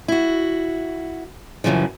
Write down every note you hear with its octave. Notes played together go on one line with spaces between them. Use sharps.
E4 F#4
F#2 A#2 C#3 E3 F3